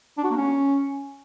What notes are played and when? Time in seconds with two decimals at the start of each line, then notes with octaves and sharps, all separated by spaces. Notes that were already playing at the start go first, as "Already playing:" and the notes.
0.18 D4
0.24 F#4
0.30 A#3
0.37 C#4